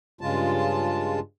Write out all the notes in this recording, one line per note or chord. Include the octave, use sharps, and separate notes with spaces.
G2 C#3 G#3 F4 A5